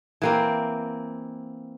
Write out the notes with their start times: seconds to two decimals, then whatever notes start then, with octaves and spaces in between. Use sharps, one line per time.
0.22 E3 A#3 C4